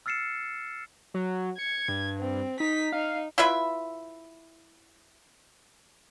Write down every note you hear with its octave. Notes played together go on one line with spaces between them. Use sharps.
E6 F6 A6 C7 C#7 E7
F#3
G#6 C#7
G2
C4
D#4 B6
D#4 F5
E4 F4 B4 E5